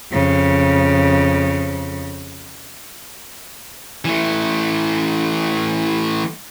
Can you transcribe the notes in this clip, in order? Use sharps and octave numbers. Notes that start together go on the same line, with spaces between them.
F2 C#3
E3 A3